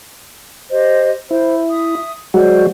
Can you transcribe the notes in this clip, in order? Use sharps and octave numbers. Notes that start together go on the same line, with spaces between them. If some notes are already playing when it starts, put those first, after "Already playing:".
G4 C5 D#5
E4 C5
E5 D#6
F#3 G#3 F#4 C5 D5